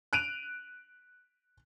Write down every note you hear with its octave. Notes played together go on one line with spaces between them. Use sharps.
F#6 D7 D#7 F7